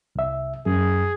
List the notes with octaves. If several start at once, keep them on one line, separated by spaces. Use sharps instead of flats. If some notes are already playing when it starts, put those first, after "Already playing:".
C2 E5
F#2 G#4